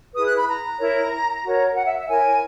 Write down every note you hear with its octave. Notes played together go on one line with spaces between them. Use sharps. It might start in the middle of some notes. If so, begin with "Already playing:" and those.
E4 G#4 B4 D#6
F#6
B5
A#5
E4 A#4 C#5
F#4 A#4 C#5
F#5
E5
E5
E4 A#4 C#5 G#5